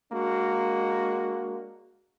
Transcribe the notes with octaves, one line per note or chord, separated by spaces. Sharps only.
G#3 A#3 D4 F#4